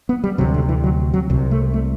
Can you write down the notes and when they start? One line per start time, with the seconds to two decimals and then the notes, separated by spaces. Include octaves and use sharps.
0.09 B3
0.24 G3
0.38 D2 C3 F#3
0.54 D3
0.69 E3
0.84 F#3
1.14 F#3
1.30 C2 C3
1.51 A3
1.74 A3